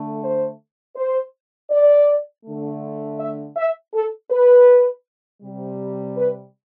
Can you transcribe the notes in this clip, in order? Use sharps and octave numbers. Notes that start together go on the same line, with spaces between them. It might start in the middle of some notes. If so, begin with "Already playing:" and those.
Already playing: D3 A3
C5
C5
D5
D3 A3
E5
E5
A4
B4
C3 G3
B4